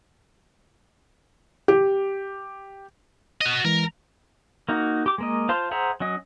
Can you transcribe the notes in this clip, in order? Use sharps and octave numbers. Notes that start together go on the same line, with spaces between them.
G4
F#4 D#5
E3 G#3 A#4
A#3 D#4 F#4
G4 D6
G#3 A#3 D#5
F4 C5 F5 A5 C6
G#4 C5 E5 F#5 A#5
F#3 C#4 D#5